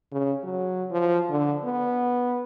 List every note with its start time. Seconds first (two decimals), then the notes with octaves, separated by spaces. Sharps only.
0.12 C#3
0.43 F#3
0.91 F3
1.30 D3
1.64 B3